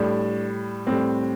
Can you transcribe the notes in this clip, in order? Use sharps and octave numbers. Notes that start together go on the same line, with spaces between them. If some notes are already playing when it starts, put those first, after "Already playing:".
Already playing: A2 G3 D4
A2 G3 C4